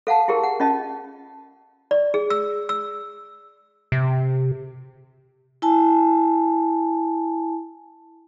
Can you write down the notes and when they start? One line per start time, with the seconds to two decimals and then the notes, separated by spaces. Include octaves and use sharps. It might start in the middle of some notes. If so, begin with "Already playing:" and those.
0.07 A4 F5 F#5 A5
0.28 E4 G4 G#4 A#4
0.43 F#5
0.60 C#4 F4 D#5 A5
1.91 D5
2.14 G#4
2.30 E6
2.69 E6
3.92 C3
5.62 E4 G#5 A5